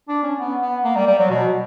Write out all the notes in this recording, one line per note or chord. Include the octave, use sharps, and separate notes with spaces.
D4
C#4
B3
B3
A#3
G3
G3
F#3
B2